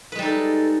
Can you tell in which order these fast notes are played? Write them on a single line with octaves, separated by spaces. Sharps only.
B4 G#3 G3 D#4 A4